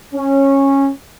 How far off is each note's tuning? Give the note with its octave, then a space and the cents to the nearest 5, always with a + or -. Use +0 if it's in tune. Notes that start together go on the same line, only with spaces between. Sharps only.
C#4 -15